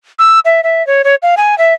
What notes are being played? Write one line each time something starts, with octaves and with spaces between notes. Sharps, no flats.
E6
E5
E5
C#5
C#5
F5
G#5
E5